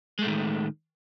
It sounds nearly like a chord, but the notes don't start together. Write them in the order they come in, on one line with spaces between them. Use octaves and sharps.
G#3 A3 A2 D#3